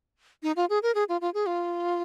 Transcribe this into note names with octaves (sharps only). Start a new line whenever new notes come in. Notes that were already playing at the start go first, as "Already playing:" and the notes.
D#4
F4
G#4
A#4
G#4
F4
F4
G#4
F4